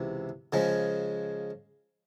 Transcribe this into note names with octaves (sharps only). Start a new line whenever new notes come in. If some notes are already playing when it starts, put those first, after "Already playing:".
Already playing: C#2 C3 E3
C#3 F3 G#3